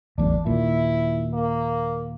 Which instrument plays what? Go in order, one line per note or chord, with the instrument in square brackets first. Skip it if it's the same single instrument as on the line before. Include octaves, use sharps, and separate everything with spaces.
[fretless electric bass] D1 A1 E2 [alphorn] D4
[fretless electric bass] D#2 A#2 [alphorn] E4
[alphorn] A#3